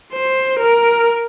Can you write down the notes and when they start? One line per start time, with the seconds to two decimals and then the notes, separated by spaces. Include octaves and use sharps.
0.13 C5
0.59 A#4